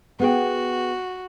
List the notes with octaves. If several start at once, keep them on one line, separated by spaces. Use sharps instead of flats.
B3 F#4 G#4 G5